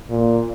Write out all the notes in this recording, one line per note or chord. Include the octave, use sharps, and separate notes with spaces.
A#2